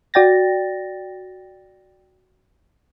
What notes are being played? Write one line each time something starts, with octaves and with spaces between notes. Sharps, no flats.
F#4 D5 G5 A6 A#6